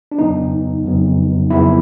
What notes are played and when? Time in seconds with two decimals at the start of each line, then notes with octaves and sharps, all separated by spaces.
0.12 D4
0.19 F2 C#3 F#3 B3 D#4
0.84 F2 C#3 F#3 B3
1.50 F2 C#3 F#3 B3 E4